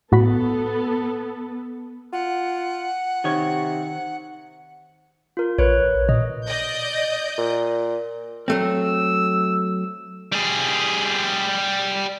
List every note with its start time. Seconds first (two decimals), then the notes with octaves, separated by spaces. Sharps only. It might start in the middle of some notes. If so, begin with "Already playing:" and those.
0.12 A2 B3 F#4 A4 B5
2.13 F4 F#5
3.24 C3 D#3 C#5
5.37 F4 A#4
5.59 A#1 A#4 B4 C#5
6.09 A#2 D#5
6.47 D5 D#5 G6
7.38 A#2
8.48 F#3 A3 C4 E6
10.32 G3 G#4